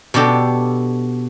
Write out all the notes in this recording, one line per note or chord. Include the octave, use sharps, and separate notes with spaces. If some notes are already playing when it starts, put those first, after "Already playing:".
B2 B3 D4 G4 A4